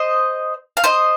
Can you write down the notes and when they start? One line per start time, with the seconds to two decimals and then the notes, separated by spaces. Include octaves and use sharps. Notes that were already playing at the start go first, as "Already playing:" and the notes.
Already playing: C5 D#5
0.77 F5
0.84 C5 D#5